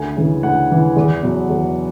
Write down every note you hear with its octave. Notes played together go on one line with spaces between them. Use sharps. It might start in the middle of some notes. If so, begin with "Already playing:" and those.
Already playing: D2 G#5
C#3 E3
D2 F#5
C#3 E3
E2
B2 F#3
E2